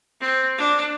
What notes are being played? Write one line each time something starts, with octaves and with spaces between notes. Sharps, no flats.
C4
D4